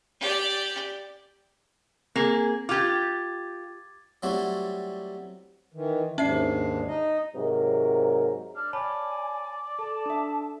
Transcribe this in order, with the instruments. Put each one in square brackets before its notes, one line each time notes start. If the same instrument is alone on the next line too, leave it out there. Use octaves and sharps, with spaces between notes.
[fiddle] G4 D5
[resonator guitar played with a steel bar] A#3 G#4 [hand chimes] C4
[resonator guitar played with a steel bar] F4 G4 [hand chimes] D6 G#6 A6
[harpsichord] F#3 G3 A3 C4 E4 F#4
[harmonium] D#3 E3
[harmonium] D#2 G#2 D4 [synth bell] C#4 E5 C7
[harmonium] D#4 D#5
[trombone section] G#2 C3 F#3 A#4
[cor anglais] D4 [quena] F6
[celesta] C#5 A5 B5 [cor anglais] D5 [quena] G#5
[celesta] A4 [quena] A5
[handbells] D4 E5